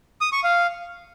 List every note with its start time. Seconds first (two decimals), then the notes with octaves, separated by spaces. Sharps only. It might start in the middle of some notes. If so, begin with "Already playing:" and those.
0.21 D#6
0.32 C#6
0.44 F5